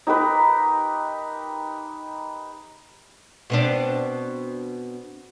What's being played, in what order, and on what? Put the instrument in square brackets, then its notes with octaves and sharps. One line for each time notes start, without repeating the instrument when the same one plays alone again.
[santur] D#4 G4 A#4 B4
[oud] B2 C4 D4